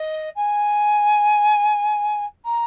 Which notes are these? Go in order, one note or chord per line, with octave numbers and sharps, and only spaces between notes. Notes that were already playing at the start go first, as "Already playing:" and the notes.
Already playing: D#5
G#5
A#5